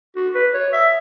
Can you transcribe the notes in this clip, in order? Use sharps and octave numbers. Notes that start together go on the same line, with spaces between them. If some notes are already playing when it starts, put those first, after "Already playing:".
F#4
B4
C#5
E5